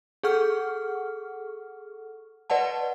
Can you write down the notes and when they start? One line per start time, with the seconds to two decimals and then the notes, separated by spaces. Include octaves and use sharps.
0.23 G#4 A4 F#5 C#6 F6
2.50 B4 D5 D#5 F#5 A5